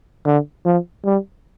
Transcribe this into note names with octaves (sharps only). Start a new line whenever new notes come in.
D3
F3
G3